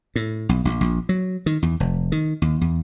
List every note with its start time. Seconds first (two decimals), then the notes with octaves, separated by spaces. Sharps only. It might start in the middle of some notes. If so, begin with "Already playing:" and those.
0.16 A2
0.49 B1
0.65 A#1
0.81 A#1
1.09 F#3
1.46 D#3
1.62 E2
1.80 F1
2.12 D#3
2.42 D#2
2.61 E2